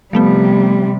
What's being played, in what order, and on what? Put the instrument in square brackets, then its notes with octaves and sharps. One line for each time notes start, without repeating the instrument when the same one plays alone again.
[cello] C3 G3 [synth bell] F3 A3 B3